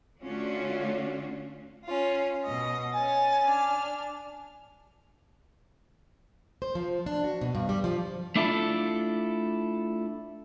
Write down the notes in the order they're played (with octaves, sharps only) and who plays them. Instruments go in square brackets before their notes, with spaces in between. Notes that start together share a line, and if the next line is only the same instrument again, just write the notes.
[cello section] D3 A3 C#4 D4 F4 F#4
[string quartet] C#4 F4
B2 D#5
[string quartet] C#4 A6 [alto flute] G#5
[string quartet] D4 F6
[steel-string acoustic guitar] C5
F3
D4
F#4
B2
G2
G3
F3
[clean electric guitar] A3 D4 E4 F4 A4